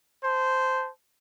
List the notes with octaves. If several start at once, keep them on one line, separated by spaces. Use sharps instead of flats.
C5 A5